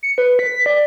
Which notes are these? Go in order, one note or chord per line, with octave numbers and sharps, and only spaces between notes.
C#7
B4
B6
D5